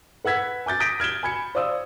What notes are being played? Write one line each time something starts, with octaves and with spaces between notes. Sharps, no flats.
B4 F#5 E6 G#6 B6
G#5 D6 G6 A6
D#6 G6 A#6 B6 D7 D#7
F6 G#6 D7 E7 G7
G#5 B5 G#6 C#7
C5 D5 F5 D#6 E6